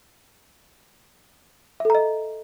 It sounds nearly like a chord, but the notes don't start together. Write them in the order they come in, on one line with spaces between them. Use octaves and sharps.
E5 A4 A#5 D#5